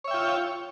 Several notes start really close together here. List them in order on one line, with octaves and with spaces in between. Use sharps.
C#5 E5 G5 F4